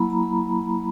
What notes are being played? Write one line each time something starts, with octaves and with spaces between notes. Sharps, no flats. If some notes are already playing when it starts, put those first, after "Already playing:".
Already playing: F#3 A#3 E4 A#5 B5
A#5
B5